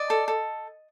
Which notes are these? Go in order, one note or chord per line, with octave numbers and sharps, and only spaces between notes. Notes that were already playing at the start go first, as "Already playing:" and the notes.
Already playing: D5 D#5
A4
A4